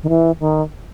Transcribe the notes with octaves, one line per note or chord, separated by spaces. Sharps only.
D#3
E3
D#3